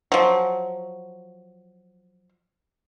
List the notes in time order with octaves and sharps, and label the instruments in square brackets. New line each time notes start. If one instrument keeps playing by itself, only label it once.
[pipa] F3 F#3